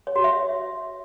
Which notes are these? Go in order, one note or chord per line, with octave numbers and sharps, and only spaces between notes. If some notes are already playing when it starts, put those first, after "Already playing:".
C#5
F#4
E5
C#5